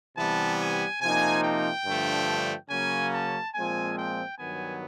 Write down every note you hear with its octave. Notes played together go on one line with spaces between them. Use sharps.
C3 E3 G3 B3 A5
G#5
C3 F3 A#3 D#4 G#5
G5
G2 D3 F3 A3
C#3 F#3 A#3 C#4 G#5
A5
A#2 F3 G#3 C4 G#5
G5
G2 D#3 F#3 B3 G#5